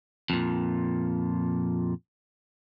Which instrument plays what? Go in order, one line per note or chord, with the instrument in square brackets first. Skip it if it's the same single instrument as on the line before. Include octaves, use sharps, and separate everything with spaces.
[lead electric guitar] F2 A#2